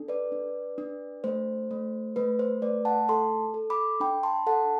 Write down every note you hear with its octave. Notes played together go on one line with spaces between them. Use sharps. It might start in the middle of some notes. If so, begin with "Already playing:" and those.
Already playing: D4 A4
B4 D5
D4
D4
A3 C5
A3
A3 B4
C5
A3 B4 D5
F#5 A5
A4 A5 C6
A4
B5 D6
D4 G5 B5
A5 C6
A4 F#5 A5